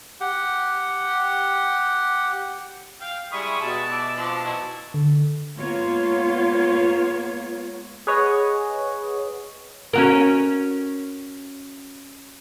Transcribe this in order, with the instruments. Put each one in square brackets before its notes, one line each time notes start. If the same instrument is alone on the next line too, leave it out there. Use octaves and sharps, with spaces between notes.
[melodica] G4 F#5
[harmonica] F5 G5
[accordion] G3 C#6 D#6 [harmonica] G#3 E4 B5
[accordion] B2 A5
[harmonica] D5 E5
F3 C4 D4
E3 F#3 F#4
[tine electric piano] D3
[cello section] G#3 A#3 B3 F4 C#5
[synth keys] G#4 B4 C#5 D#5 F#5
[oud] C#4 F#4 A#4